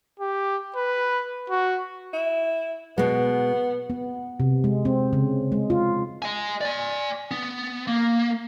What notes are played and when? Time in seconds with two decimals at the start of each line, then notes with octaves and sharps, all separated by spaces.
0.20 G4
0.76 B4
1.50 F#4
2.13 E4
2.98 B2 G#3 B3
3.90 B3
4.40 C3
4.64 G#3
4.85 C4
5.13 C#3
5.52 G#3
5.70 F4
6.22 D#5 G#5
6.61 D5 G#5
7.31 B3
7.87 A#3